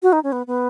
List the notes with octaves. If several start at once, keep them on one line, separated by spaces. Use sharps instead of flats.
F#4
D#4
C#4
B3
B3